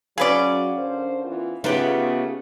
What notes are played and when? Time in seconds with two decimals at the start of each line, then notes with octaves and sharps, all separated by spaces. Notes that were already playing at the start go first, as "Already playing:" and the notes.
0.18 F#3 C#4 G#4 B4 D5 F5
0.77 D3 A#4 C5
1.25 E3 B3 F4
1.64 C#3 A3 B3 D#4 F4 G4 F#5